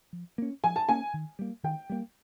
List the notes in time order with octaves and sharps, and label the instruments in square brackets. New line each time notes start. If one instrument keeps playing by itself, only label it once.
[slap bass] F3
A#3 C#4
[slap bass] F3 [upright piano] G#5
[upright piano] A5
[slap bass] A#3 C#4 [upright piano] G#5
[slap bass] D#3
G3 A#3
[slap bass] D#3 [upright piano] G5
[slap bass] G3 A#3